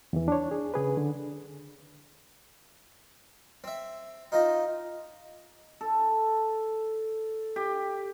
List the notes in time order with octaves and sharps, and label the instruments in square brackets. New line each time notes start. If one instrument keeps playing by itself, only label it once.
[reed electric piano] E2 E3
D4 C#5
G#4
C#3 G#4 B4
D3
[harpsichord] C4 E5
D#4 F4 C5 D#5
[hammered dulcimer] A4
G4